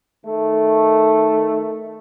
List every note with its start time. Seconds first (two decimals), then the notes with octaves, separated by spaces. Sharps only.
0.24 D#3 A3